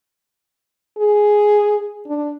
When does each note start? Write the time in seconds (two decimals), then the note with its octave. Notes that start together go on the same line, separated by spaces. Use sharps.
0.98 G#4
2.07 D4